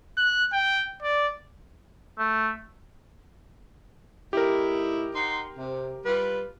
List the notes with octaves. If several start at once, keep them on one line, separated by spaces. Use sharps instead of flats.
F#6
G5
D5
A3
A2 D#4 E4 G4 A#4
D#4 F#5 C6
C3
G3 F4 B4